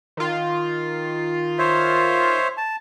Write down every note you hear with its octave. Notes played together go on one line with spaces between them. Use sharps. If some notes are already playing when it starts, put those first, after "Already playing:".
D#3 F4
C5 C#5 E5
A5